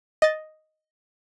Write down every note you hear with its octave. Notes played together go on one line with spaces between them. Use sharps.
D#5 A6